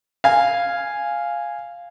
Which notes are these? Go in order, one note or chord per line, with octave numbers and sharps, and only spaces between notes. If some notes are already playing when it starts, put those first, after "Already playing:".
F5 G#5